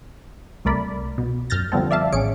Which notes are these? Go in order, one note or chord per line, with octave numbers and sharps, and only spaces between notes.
C2 A3 A#4 D5 B5
B2
F#2 F6 G6 A6 A#6
D3 F3 G3 B3 C4 A4
D5 E5 F5 A5
A1 C#4 G#4 C#7 D7